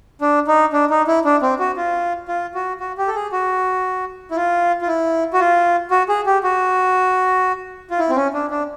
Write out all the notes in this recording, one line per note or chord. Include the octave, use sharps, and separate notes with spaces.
D4
D#4
D4
D#4
E4
D4
C4
F#4
F4
F4
F#4
F#4
G4
A4
G#4
F#4
E4
F4
F4
E4
F#4
F4
F#4
G#4
G4
F#4
F4
E4
C4
C#4
D4
D4